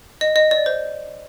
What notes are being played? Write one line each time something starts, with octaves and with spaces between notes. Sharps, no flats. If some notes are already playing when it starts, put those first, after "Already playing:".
D#5
D#5
D5
C5